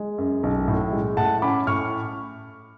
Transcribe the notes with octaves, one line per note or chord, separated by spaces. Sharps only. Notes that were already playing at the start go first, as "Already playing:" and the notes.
Already playing: G#3
F#2
B1
A2
G#3
A2 F#5 A5
C#4 B5 D6
A2 C#6 F6